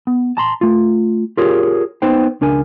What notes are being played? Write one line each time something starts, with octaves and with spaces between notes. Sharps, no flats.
B3
A5 A#5 C6
A3 F4
F4 G4 G#4 A#4 C#5
B3 D#4 B4 C5 G5
C#2 D4 A#4 G#5